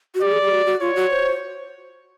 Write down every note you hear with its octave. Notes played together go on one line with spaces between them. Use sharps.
F#4
G4 D5
G#4
G4
F#4
F#4
F4 C#5
F#4
C5